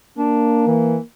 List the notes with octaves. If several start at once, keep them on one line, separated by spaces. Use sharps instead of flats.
A#3 D4
E3